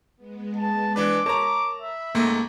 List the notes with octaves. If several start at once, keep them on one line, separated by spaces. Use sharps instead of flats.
G#3 B3
A5
E3 D4 B4 D6
A#4 C#5 A5 A#5
E5 B5
C#2 G#2 A3 A#3